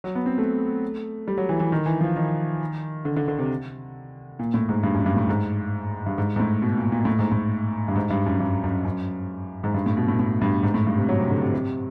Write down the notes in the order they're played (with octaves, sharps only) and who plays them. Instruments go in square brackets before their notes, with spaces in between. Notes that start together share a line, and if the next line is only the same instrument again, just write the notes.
[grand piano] F#3
B3
C4
A3
G3
F#3
E3
E3
D#3
E3
F3
D#3
D3
D3
D3
C3
A#2
A2
G#2
G2
F#2
G2
A2
G#2
G2
G#2
G#2
A2
B2
A#2
A#2
A2
G#2
A2
G2
G#2
G2
F#2
G2
F#2
F#2
G#2
G2
A2
B2
A2
A2
G2
G#2
A2
G2
C3
F#3
C3
D3
C3
C3